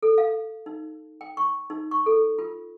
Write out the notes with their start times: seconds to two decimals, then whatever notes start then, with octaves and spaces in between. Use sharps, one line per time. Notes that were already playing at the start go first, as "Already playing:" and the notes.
0.03 A4
0.18 F5
0.66 D#4
1.21 G5
1.37 C#6
1.70 D#4
1.91 C#6
2.06 A4
2.39 F4